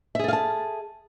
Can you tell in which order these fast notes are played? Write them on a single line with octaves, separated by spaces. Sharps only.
E5 G#4 A4 F5 A5